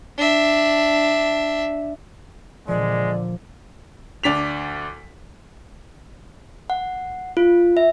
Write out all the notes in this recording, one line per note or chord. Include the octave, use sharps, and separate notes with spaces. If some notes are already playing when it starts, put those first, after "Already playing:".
D4 E5
A#2 D3 F3 G#3 D5
D2 D4 B6 F7
F#5
F4
E5